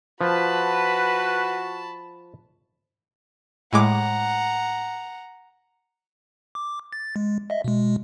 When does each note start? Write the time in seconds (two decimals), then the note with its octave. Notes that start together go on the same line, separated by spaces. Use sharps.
0.21 F3 F#4 B4 A5 B5
3.73 A2 G#3 F#5 A#5 D6
6.55 D6
6.93 A6
7.16 G#3
7.50 D#5 E5
7.64 B2 G#3